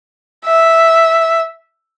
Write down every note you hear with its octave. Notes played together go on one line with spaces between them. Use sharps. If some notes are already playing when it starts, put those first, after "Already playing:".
E5